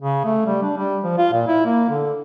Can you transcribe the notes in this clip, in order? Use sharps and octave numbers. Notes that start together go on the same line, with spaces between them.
C#3
A3
G3
D4
G3
F3
F4
A#2
E4
A#3
D3